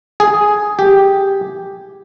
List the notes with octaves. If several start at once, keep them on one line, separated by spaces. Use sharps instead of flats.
G#4
G4